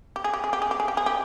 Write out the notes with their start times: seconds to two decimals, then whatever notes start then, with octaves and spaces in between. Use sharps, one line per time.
0.16 G4
0.24 G#4
0.34 G4
0.44 G#4
0.53 G4
0.62 G#4
0.71 G4
0.80 G#4
0.88 G4
0.97 G#4
1.06 G4